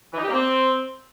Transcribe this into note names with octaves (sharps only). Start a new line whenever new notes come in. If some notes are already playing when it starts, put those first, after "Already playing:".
E3
D#4
G4
A#3
C4